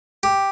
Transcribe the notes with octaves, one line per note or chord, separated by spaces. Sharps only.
G4